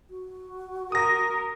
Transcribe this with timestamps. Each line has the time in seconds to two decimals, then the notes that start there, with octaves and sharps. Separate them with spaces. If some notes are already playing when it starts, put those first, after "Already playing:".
0.10 F#4
0.92 A#4 D#6 A#6